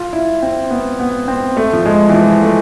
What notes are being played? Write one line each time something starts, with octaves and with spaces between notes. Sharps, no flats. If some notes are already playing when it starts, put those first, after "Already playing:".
Already playing: F4
E4
C4
B3
B3
C4
A3
F3
G#3
E3
F3
A3